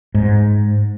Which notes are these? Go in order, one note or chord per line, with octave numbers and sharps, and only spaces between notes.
G#2